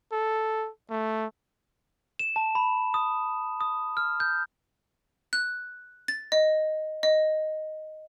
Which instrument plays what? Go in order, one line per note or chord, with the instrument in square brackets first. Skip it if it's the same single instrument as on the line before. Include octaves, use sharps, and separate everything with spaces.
[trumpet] A4
A3
[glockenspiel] E7
A5
B5
D#6
D#6
F6
G6
[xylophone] F#6
A6
D#5
D#5